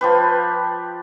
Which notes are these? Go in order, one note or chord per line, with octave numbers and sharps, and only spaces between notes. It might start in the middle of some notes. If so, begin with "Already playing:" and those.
F3 G4 B4